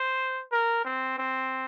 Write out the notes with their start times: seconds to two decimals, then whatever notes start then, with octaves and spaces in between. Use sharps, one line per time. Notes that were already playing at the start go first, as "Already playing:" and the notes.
Already playing: C5
0.52 A#4
0.85 C4
1.18 C4